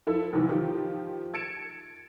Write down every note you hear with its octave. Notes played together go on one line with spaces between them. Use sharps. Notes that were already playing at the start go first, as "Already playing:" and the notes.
F3 E4 A4
B1 G#2 C3 D#3 E3
D#3 F3 G4
G#6 A6 C#7 D7 E7